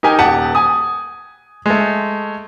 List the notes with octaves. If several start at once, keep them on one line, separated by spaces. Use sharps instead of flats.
D#4 G4 A#4 G#5
D#1 G4 F#5 A5
G#5 D#6
G#3 A3